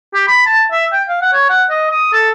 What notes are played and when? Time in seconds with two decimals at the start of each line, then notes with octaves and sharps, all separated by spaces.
0.14 G4
0.28 B5
0.46 A5
0.71 E5
0.93 G5
1.09 F5
1.21 F#5
1.33 C#5
1.50 F#5
1.70 D#5
1.91 D#6
2.13 A4